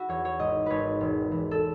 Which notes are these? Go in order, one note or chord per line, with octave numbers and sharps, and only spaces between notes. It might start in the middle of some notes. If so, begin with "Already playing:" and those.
Already playing: E4 F#4
E2 C#5
C#5
G#1 D#5
G#1 B4 C#5
E1
E3
A4